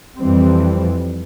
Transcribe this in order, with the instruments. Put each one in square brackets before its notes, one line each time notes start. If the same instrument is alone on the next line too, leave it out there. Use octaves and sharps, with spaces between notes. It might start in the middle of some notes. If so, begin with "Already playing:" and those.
[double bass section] F2 E3 G3 C4